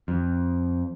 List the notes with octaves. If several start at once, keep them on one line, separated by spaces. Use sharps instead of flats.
F2